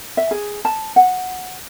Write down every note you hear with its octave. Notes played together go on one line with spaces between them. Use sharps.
E5
G#4
A5
F#5